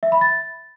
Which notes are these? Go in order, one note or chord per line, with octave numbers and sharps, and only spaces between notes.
E5
B5
A6